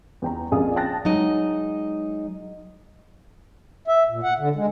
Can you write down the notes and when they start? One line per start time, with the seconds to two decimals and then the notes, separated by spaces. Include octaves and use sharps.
0.22 E2 G5 A#5
0.51 A#1 F2 G#4 D5 F5 D#6
0.76 G5 A5 F#6 A6 A#6
1.05 F#3 G#3 D#4 D#5
3.88 E5
4.09 A#2
4.23 F#5
4.39 D3
4.56 G#3